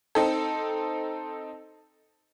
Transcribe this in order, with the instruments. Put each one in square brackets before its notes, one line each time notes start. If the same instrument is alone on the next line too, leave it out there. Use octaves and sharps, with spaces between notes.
[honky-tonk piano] C4 D#4 A4